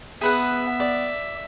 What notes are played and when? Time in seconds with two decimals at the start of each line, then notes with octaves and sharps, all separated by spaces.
0.21 B3 G#4 B4 E5 F#5
0.80 D5